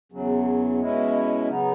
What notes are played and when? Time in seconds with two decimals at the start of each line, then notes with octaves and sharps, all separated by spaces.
0.12 E2 C#3 F#3
0.80 B2 G#3 C#4 E4
1.47 C#3 F#3 B3 D#4